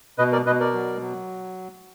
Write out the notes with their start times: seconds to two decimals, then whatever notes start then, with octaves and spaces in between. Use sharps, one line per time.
0.18 B2 B4 D#5
0.32 A#4 D5
0.46 B2 B4 D#5
0.60 A#4 D5
0.73 F#3
1.01 F#3